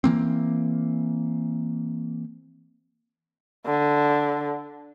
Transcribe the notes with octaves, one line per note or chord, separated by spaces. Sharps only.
E3 A#3 C4
D3